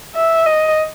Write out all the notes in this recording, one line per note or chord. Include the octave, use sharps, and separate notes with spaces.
E5
D#5